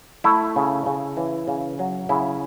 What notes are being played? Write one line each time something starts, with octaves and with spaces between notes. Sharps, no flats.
A3 E4
C#3
C#3
E3
C#3
F#3
C#3 E4